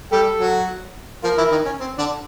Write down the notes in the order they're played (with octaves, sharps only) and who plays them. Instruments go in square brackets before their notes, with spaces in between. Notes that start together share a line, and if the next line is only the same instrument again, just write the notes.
[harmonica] G3 G4 [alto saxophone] A4
[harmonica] F#3 F#4
[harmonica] F3 F4 [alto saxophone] A#4
[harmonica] E3 E4
D#3 D#4
C#4
C4
D3 D4